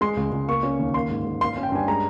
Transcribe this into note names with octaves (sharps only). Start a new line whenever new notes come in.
G#3 C6
C#2
C#2
A#3 C#6
C#4
D#2
A#3 C6
G#2
G#2
A#3 C6
C#4
G5
G2 G#5
G#3 A#5